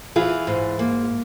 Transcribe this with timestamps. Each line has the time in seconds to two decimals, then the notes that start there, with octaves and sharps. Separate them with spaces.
0.16 E3 F4 G#4
0.47 G#2
0.79 A#3